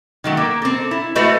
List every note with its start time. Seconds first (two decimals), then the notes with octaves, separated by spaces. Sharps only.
0.24 D#3 F#3 A3
0.37 A#3
0.62 C4 A4
0.91 E4
1.15 A3 F#4 A4 B4 C5 D#5